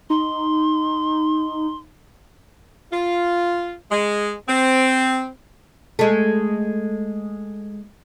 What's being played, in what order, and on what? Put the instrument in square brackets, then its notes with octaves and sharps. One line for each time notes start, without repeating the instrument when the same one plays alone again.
[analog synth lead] D#4 [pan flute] C6
[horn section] F4
G#3
C4
[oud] G#3 A3